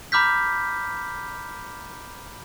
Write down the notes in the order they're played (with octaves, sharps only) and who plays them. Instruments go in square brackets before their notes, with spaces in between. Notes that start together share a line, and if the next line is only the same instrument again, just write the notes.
[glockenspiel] A#5 B5 D6 F6 G6 B6